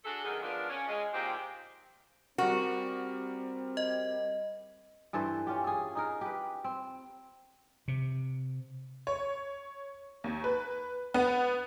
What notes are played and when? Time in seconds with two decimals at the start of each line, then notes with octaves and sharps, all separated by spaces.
0.05 D4 F#4 G#4 A4
0.25 F#2 D#3 G#4
0.43 F3 B3 D4 F4 G#4 A#4
0.69 C#4
0.88 G#3
1.13 A#2 D#3 G#3 C4 F4 G4
2.38 G3 C4 F#4 A#4
3.77 D#5
5.13 G2 E3 A4 C5
5.47 C#4 F4 G4
5.64 G#4 A4
5.95 D#4 G#4 A#4
6.21 G4 B4
6.64 C4
7.88 C3
9.07 C#5
10.24 D#2
10.44 B4
11.14 B3